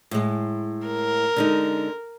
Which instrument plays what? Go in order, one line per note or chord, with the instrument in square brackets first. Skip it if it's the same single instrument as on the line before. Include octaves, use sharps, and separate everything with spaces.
[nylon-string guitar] A2 G#3
[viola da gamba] A#4
[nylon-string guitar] D3 G#3 D#4